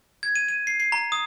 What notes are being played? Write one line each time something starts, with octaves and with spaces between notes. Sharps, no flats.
G#6
D#7
D#7
C7
C7
A#5
D#6